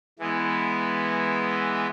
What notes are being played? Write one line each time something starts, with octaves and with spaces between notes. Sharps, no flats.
E3 G#3 B3 E4